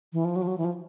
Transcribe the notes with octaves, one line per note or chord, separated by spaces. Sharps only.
E3
F3
F#3
F3
F#3
E3
F3